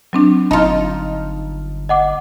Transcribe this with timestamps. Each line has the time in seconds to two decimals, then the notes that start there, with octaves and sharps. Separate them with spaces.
0.13 F#3 C4 D4
0.51 G1 D#4 F4 A5
1.89 D#5 F#5 D6